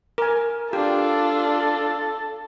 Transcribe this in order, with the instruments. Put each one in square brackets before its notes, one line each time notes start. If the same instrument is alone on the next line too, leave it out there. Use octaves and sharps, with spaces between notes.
[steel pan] A#4 G#5
[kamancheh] D4 F4 [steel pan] G4 [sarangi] A4